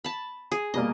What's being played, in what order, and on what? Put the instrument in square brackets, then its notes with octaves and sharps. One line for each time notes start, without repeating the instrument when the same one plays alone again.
[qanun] A5 B5
G#4
[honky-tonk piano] B2 G3 A#3 [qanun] D#5